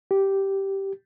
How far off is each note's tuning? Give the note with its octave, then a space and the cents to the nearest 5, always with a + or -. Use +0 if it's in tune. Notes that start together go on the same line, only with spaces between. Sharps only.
G4 -10